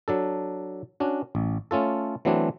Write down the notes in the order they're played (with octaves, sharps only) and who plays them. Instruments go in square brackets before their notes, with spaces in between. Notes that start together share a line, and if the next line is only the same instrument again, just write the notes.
[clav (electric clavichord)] F#3 D4 A4
C#4 D4 F#4
A1
A3 C#4 F4 A4
E3 F#3 A3 B3 C4 D4